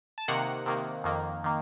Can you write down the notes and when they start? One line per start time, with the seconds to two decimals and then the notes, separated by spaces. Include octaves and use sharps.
0.18 A5
0.28 C3 D#3 A#3 F#5
0.66 C3 D#3 A#3
1.04 F2 D#3 A#3
1.44 D#3 A#3